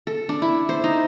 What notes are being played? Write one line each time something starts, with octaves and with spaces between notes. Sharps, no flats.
A4
D4
E4
C5
D#4